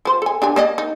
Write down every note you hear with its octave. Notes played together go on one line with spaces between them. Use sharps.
F3 C5
A4 G#5
D4 G4 G#5
A#3 D5 D#5
D#4